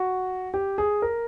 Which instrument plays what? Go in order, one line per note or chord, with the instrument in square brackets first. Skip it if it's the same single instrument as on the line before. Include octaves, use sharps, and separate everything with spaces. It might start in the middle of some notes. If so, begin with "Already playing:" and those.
Already playing: [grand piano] F#4
G4
G#4
A#4